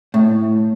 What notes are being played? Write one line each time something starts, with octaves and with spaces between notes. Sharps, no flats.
A2